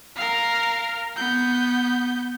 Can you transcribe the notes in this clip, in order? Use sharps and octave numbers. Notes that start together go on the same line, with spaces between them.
A#4 F5
B3 G6